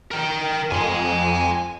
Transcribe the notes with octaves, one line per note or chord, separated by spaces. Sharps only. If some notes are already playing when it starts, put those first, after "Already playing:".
A#4 G5
F2 G#5 C6